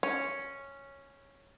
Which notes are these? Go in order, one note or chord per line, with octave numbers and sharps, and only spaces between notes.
C#4